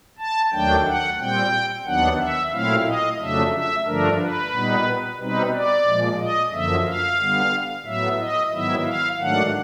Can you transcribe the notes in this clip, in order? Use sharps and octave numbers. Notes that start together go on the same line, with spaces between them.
A5
D#2 D#3 F#3 A3 D4 G5
F#5
A#2 G3 C4 G5
D#2 D#3 F#3 B3 D4 F#5
E5
A#2 F#3 A3 C4 E4 F5
D#5
F2 C#3 F#3 A3 D4 E5
E5
G2 D3 F3 A3 D4 A#4
B4
A#2 G3 B3 D#4
B2 G3 C4 D#4 B4
D5
A#2 F3 G#3
D#5
F#2 D3 F3 A#3 E5
F5
D3 G3 B3
A2 F#3 B3 E5
D#5
G#2 D#3 F#3 B3 E4 E5
F5
G#2 D#3 F#3 A3 D4 F#5